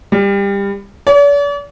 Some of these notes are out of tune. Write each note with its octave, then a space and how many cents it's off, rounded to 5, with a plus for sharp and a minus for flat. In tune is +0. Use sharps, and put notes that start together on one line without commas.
G3 +25
D5 -45